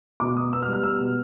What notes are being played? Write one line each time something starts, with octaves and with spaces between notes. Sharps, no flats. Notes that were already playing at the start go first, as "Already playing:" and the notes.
B2 D6
B2 D#6
B3 E6
F6
G3
F6
B3 E6
B2